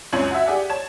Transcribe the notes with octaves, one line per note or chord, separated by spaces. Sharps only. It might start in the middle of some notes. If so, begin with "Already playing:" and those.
C#2 F#2 C#4 F4 G#6 F#7
F#4 E5
G4 G#4 D5 F#5
C#5 A5 G#6 E7